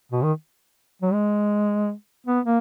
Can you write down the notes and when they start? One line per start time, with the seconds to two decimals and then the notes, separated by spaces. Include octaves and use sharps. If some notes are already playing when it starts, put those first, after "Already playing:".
0.12 B2
0.23 D#3
1.02 F#3
1.13 G#3
2.27 B3
2.45 A#3